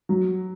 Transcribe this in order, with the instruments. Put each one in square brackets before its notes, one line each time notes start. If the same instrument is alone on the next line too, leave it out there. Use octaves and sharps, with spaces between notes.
[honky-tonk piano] F#3